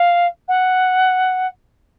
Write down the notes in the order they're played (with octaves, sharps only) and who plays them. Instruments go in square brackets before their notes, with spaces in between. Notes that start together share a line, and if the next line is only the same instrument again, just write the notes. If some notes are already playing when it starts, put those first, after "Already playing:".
Already playing: [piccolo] F5
F#5